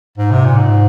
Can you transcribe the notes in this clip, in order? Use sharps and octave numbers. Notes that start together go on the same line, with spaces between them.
G#2
C3
A#2
G#2